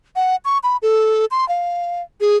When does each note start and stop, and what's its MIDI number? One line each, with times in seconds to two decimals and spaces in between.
0.16 0.36 78
0.45 0.58 85
0.63 0.77 83
0.82 1.26 69
1.31 1.47 84
1.49 2.02 77
2.20 2.37 68